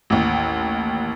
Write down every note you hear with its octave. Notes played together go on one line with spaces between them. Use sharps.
A1 D#2